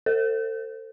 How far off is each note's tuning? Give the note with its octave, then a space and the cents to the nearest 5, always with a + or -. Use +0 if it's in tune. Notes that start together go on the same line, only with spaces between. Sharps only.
A4 +35 C5 +0